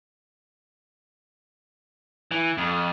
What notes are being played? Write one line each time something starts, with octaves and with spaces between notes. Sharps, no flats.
E3
F2